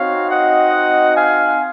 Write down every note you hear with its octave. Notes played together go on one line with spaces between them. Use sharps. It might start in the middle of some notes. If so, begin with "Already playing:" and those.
Already playing: C4 D#4 F#4 C#5 F5
D#5 F#5
F5 G#5